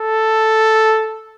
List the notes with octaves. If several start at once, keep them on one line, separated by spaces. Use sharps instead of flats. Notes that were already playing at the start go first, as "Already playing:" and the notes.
Already playing: A4